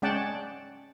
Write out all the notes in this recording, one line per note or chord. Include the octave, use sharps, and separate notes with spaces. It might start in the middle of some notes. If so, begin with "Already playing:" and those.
G#3 C#4 D5 F#5 G5 A5